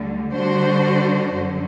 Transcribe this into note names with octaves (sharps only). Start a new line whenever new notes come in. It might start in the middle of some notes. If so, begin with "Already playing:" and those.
Already playing: D2 D3 G3
D3 G3 D4 F#4 C5
F#2 D3 F#3